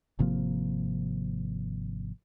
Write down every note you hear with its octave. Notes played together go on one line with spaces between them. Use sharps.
G#1 C3 F3 A#3